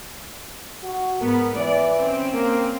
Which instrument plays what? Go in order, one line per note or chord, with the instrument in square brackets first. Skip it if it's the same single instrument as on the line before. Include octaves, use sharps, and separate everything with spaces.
[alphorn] F#4
[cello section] G#2 B3 [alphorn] A#4
[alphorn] E3 [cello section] D5
[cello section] C4 C#4
[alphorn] A#3